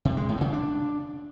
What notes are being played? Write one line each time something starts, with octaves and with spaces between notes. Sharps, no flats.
C3
G#3
A2
C#3
D4